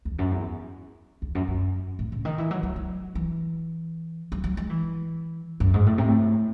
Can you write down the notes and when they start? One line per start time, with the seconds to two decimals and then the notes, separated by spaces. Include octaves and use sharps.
0.05 E2
0.19 F#2
0.31 E2
1.22 E2
1.35 F#2
1.48 F#2
1.99 A2
2.12 C#3
2.25 D#3
2.38 E3
2.51 F#3
2.63 F#3
2.76 F#3
3.15 E3
4.32 F#3
4.44 F#3
4.57 G#3
4.70 E3
5.60 F#2
5.74 G#2
5.86 A2
5.98 C3
6.08 A2